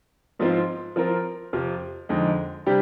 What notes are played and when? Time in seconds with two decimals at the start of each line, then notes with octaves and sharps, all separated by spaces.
0.39 G#2 F3 C4 F4
0.96 F3 C4 F4 A#4
1.53 F2 C3 F3
2.09 F2 D3 G#3 D#4
2.66 C3 G3 D4 G4